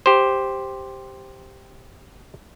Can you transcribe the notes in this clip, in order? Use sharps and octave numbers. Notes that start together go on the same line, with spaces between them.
G4 C5